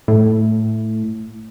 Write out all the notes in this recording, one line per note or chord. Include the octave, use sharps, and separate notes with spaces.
A2